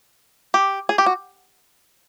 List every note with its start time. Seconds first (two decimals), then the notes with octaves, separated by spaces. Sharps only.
0.54 G4
0.89 G#4
0.98 G4
1.06 F#4